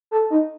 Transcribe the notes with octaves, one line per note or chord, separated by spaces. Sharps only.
A4
D#4